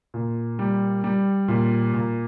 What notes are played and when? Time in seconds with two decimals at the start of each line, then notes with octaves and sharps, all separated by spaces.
0.14 A#2
0.59 G3
1.04 G3
1.48 A#2
1.93 A#2